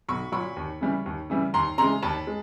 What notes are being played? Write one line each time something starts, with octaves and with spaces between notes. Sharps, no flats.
B1 B5 C#6
A#2 F#3 B5 C#6
D#2
C#3 E3 G3
D#2
C#3 E3 G3
D#2 A#5 C6
C#3 E3 G#3 A#5 C6
D#2 A5 B5
G#3